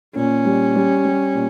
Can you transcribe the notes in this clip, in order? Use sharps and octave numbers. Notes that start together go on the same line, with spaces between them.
A#2 C#4
G3
G3
G3
A#2